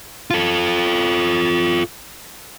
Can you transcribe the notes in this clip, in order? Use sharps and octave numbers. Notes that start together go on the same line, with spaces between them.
F4 A4